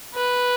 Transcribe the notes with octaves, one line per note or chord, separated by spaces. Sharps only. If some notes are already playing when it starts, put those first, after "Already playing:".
B4